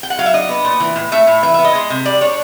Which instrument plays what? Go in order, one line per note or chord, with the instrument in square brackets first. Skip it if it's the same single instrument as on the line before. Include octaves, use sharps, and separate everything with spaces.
[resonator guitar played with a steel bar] G5
F#5
F#3 F5
E5
D4 D#5
B3
A#2
E3
A2
A3 E5
A2
E3 E5
B3 E5
D#5
G#3
C3
G3 D5
D4 C#5